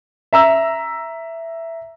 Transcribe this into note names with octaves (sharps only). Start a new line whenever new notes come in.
E5 A#5 E6